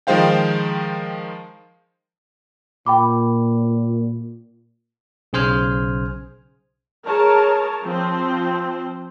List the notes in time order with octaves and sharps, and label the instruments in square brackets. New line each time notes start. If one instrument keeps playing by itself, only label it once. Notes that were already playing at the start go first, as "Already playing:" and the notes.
[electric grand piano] D#3 F3 G#3 C5 F5 G5
[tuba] A#2 [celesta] G5 B5 D6
[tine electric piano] B1 C#3 G#4 C5 G#5 F6
[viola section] G#4 A#4 C#5 A5
F3 C4 C5